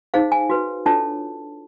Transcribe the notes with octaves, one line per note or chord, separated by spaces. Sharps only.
D#4 G#4 C5 F5
G#5
F#4 B4
D4 F4 A4 C#5 A5